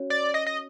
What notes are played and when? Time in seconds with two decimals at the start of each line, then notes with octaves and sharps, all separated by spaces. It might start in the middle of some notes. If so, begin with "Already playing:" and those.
Already playing: C#4 F#4 C#5
0.10 D5
0.34 D#5
0.47 D#5